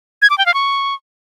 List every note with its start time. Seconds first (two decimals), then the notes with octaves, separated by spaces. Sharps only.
0.22 G#6
0.30 D6
0.38 G5
0.46 F5
0.54 C#6